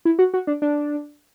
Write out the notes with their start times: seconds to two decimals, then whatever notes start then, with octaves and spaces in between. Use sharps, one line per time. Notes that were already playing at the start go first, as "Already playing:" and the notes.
0.05 E4
0.19 F#4
0.34 F#4
0.47 D4
0.62 D4